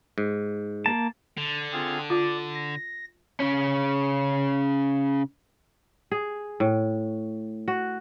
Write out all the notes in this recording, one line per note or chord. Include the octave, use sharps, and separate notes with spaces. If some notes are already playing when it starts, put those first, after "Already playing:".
G#2
A#3 A5
D3
C4 F4 G#4
F4 D5 D6
A#6
C#3 C#4
G#4
A2
F#4